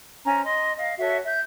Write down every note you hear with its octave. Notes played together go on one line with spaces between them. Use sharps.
C#4 C5 A#5
D#5 C6
D#5 F5
F#4 A4 C#5 E5
E5 G6